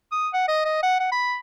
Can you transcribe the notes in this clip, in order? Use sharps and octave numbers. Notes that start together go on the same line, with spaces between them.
D#6
F#5
D#5
D#5
F#5
F#5
B5